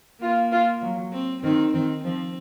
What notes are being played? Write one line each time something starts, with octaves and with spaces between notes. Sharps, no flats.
A#3 F4
F4
F#3
C4
D#3 C4
D#3 C4
F3 C4